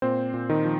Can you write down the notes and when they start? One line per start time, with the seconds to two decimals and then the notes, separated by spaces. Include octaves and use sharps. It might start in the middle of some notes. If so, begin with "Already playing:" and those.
0.02 A#2 C4 C5
0.34 A#2
0.50 D#3 D#4
0.65 F3